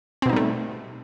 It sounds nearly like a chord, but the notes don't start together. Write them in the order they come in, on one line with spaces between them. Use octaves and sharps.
C4 B2 D#4 G3 A3